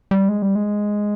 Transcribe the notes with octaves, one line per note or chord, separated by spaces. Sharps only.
G3
G#3
G3
G#3